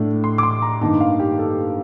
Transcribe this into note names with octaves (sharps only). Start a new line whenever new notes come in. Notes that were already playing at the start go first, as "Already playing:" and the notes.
Already playing: A2 A3 D4
C6
D6
C6
A#5
G2 D#3 A#3 D#4 A5
F5
G4
A4